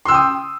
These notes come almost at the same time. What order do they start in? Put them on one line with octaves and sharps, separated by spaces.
C6 E6 G5 D#6